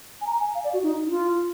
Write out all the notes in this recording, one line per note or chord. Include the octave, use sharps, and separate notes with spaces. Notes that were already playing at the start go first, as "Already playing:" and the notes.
G#5
A#5
G#5
F5
D5
F#4
D#4
D#4
F4